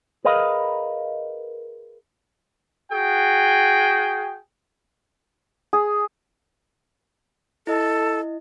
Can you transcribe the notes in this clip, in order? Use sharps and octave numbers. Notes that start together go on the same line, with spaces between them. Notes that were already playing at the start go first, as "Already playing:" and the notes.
G#4 A#4 B4 D#5 F5
F#4 G#4 G5
G#4
E4 A4 D#5